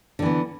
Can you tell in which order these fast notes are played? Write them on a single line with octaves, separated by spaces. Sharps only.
D3 E3 B3